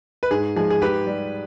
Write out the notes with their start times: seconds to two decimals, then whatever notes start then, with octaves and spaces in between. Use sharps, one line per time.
0.23 B4
0.31 G#2 G#4
0.56 F3 G#3 G#4
0.70 G#4
0.82 G#2 G4 B4
1.07 G3